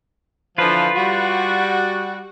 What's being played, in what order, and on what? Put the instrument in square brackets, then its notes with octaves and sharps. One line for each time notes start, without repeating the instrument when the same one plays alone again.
[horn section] D3 E3 F3 [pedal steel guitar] F4 B4
[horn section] G3 F#4